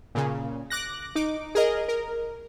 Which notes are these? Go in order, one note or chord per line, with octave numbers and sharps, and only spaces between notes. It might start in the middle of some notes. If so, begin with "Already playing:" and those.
A#2 C#3
D6 F#6 A#6
D#4 D6
G#4 A#4 D#5
A#4